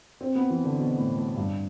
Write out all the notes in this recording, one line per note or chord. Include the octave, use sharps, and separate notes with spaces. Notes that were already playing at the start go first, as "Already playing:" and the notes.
C4
B3
E3
D3
B2
A2
A2
G2